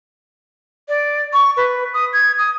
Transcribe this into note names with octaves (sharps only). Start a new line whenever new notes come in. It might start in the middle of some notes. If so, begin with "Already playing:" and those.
D5
C#6
B4
D#6
G#6
D#6